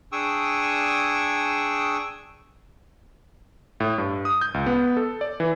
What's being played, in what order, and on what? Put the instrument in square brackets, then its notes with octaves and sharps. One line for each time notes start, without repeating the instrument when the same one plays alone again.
[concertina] D4 G#4 G5 C#6 D#6 E6
[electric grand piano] A2
G2
D#6
G6
C#2
B3
A4
D5
E3